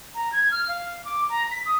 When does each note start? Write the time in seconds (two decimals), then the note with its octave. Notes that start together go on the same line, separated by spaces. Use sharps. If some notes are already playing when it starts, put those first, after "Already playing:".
0.14 A#5
0.32 G#6
0.51 F6
0.68 F5
1.05 D6
1.29 A#5
1.51 B6
1.66 D#6